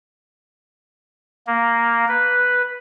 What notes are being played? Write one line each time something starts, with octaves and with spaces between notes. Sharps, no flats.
A#3
B4